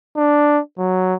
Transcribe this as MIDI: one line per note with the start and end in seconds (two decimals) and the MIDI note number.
0.17 0.60 62
0.78 1.15 54